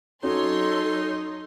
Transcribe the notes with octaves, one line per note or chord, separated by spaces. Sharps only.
F#3 C#4 D#4 F#4 A4 C#5 C6